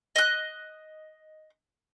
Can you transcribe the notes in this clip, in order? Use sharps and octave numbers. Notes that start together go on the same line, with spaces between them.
D#5 F#6